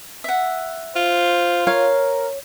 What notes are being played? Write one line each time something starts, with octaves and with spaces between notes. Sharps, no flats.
E5 F#5
F4 C5
A#4 C#5 F5